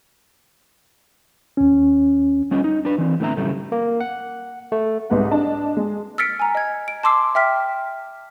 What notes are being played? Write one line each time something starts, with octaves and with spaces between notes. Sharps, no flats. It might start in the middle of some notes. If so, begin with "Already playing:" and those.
D#2 C#4
G3 C#4 F4 D#5
D#4
D4 B4
E3 C4
A2 D3 B3 C4 E5 A#5
F#2 A2 C#3 G3 A3
A#3
F#5
A3
C2 G#2 B4 F#5
D4 D#5 A5
G#3
E6 F6 A6 B6 C#7 D7
G#5 A#5
D#5 G#6
D7
A5 C6 D6 E6 C7
E5 G5 F6 B6